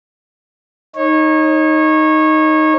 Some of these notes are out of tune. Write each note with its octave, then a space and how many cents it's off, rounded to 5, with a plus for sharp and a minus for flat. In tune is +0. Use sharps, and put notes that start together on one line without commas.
D#4 +0 C#5 -25